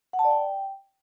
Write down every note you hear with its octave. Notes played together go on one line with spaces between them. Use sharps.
F#5
A5
D5
G5